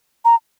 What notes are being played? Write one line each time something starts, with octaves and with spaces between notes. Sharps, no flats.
A#5